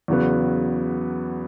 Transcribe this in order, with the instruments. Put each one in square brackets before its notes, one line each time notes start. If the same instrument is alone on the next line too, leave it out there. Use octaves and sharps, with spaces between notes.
[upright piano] E2 C#3 F#3 B3